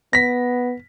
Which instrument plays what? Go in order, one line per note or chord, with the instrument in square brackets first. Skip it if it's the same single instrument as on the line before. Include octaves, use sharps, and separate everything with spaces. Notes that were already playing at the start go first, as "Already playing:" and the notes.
[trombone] B3 [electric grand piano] A#6 B6